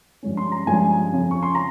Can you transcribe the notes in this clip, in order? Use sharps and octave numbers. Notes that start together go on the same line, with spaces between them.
G2 F3 G#3 C#4
C6
A#5
G2 F3 G#3 C#4 G#5
F2 C#3 F3
C#6
C6
A#5